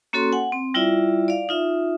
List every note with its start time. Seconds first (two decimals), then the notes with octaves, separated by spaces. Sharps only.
0.13 A#3 C#4 F#4 A4 C#5 C6
0.32 F#5 G#5
0.52 C4
0.74 G3 E4 F4 D5 E5
1.28 D5 F5
1.49 D#4 F4 E5